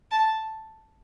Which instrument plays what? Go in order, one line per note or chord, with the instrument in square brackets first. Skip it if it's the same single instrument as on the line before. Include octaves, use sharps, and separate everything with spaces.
[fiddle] A5